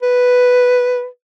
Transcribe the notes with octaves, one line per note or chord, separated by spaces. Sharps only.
B4